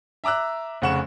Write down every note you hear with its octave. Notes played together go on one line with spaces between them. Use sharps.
E5 A#5 D6 E6 F#6
F1 C#3 F#5 C#6 E7